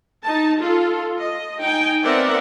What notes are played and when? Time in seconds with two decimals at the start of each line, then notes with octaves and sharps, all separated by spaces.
0.24 D#4 A5
0.60 F4 A4
1.22 D#5
1.61 D#4 G5 G#5
2.04 B3 C4 A#4 D5 E5 F#5